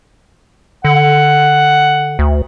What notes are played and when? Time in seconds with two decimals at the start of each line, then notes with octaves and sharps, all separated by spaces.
0.85 D3 F#5
2.19 D2